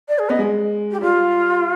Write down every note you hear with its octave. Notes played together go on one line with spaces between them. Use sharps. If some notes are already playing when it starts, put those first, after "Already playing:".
D5
G#4
B3 D#5
G#3
G4
G3 F4